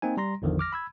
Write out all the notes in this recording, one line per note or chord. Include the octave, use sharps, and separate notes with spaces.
A#3 C4 D#4 G#5
G3 A#5 C6 A#6
G#1 E2 D3 D#3 F3
D6 F6 A#6
B5 E6 G#6